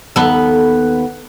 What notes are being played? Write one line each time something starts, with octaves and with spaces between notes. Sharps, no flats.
D#2 B3 A4